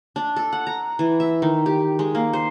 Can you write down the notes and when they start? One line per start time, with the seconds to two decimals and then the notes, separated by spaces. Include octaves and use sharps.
0.16 D4
0.36 A4
0.53 F#5
0.67 A#5
0.99 E3
1.20 E5
1.42 D#3
1.66 G4
1.99 G#3
2.15 A#3
2.33 C5